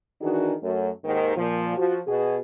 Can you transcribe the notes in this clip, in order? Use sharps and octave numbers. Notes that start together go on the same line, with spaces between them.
D#3 E3 D4 D#4 F#4 G#4
F#2 F#3 A3
D#2 G#2 D#3
A#2 F3
F3 F#4
B2 F#4 G#4